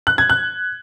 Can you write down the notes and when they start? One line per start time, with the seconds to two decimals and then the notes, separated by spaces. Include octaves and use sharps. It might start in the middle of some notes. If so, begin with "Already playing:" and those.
0.07 F#6
0.18 G#6
0.30 F#6